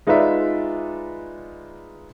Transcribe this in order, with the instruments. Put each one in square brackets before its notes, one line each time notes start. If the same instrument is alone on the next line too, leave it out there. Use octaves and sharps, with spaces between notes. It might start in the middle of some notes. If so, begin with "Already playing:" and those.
[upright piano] G#3 D#4 F4 B4 D5 E5